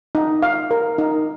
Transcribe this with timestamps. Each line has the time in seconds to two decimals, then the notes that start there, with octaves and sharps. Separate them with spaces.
0.15 D#4
0.43 F5
0.71 A#4
0.98 D#4